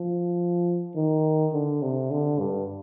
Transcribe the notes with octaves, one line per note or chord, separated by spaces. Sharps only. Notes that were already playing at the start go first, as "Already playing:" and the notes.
Already playing: F3
D#3
D3
C3
D3
G2